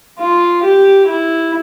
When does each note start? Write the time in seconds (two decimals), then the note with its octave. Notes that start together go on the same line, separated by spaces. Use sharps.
0.18 F4
0.63 G4
1.07 E4